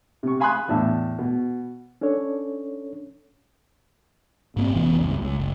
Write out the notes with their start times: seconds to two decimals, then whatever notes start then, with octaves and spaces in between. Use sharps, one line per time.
0.23 C3 C#6
0.40 F5 G#5 B5 C6 D#6 F#6
0.68 E2 A2 D4 E5 A5
1.19 B2
2.01 C#4 D4 A4 C#5
4.56 G#2 A#3 C4
4.75 F1 E3 B3 C#4
4.99 C#2 G2
5.22 C#2
5.39 F#1